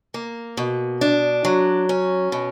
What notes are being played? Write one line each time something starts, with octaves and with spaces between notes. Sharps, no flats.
A#3
B2
D4
F#3
C#4
B2